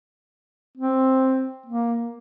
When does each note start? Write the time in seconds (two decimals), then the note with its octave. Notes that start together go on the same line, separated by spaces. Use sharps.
0.77 C4
1.66 A#3